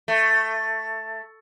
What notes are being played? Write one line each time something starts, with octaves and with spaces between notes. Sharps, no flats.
A3